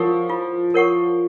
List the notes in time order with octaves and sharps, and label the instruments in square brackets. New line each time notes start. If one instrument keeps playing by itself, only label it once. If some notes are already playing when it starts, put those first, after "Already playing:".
Already playing: [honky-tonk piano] F3 [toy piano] A#4 C#5 F#5 C#6
[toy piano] F4
A#4 C#5 F#5 C#6